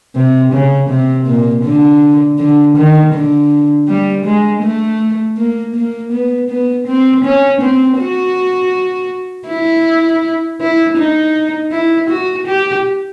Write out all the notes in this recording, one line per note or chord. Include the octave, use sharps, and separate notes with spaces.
C3
C#3
C3
A#2
D3
D3
D#3
D3
G3
G#3
A3
A#3
A#3
B3
B3
C4
C#4
C4
F#4
E4
E4
D#4
E4
F#4
G4